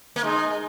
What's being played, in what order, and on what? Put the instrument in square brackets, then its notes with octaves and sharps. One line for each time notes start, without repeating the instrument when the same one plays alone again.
[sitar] A#3
[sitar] G#3 [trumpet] D#4